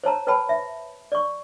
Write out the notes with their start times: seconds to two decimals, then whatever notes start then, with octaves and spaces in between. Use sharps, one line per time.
0.04 C5 C#5 A5 A#5
0.27 B4 C#5 G5 A5 B5
0.49 E5
1.12 D5 C#6